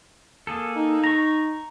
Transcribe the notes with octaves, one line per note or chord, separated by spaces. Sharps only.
A#3 G#4 A4
D#4
A#5 C#6 A#6